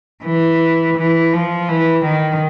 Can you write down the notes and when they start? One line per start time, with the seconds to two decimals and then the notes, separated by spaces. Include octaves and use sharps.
0.25 E3
0.98 E3
1.33 F3
1.69 E3
2.05 D#3